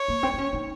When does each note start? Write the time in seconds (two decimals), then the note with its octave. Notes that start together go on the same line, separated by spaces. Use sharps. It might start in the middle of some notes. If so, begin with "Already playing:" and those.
Already playing: C#5
0.08 A#3
0.23 C4
0.33 D#4
0.38 C#4
0.53 D#4